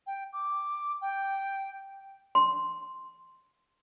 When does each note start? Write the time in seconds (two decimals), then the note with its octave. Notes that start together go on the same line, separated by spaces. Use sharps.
0.07 G5
0.33 D6
1.01 G5
2.35 C6